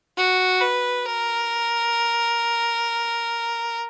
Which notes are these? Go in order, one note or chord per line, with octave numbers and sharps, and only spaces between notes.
F#4
B4
A#4